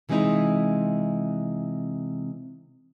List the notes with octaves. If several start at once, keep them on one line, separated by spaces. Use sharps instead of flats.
C3 E3 G#3 C4 D#4 E4